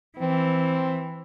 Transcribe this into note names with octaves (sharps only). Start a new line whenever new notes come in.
E3 C4